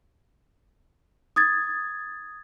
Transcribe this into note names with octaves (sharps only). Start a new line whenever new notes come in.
D#6 G#6 A6